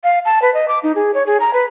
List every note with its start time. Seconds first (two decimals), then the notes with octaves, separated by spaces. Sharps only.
0.04 F5
0.25 A5
0.42 B4
0.54 D#5
0.68 D6
0.83 D#4
0.95 G#4
1.14 C#5
1.26 G#4
1.40 A#5
1.53 B4